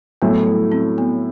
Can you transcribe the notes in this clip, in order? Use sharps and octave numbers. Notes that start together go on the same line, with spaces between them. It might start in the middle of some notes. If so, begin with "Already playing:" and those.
A2 F#3 A3 B3 E4
G3
C4
B3